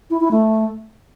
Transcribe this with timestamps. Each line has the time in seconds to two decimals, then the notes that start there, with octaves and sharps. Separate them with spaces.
0.10 E4
0.21 E4
0.31 A3